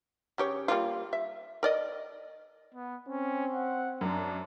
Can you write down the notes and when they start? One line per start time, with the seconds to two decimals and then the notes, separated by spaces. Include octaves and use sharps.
0.38 C#3 G4 C#5
0.68 G3 A#3 F4
1.13 E5
1.63 A#4 D5 D#5
2.74 B3
3.08 C4 C#4
3.53 F#5
4.01 F#2 D4